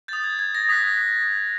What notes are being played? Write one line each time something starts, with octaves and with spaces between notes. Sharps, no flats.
D#6 G6 A6
G#6
G#6
A#6
D#6 F#6 B6